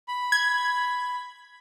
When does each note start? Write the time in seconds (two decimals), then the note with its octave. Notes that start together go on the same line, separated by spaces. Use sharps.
0.08 B5
0.32 G#6